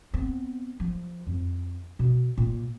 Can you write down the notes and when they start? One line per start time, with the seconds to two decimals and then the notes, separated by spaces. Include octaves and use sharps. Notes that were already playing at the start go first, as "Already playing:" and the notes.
0.14 B3 C4
0.80 F3
1.27 F2
1.99 B2
2.38 A#2 A#3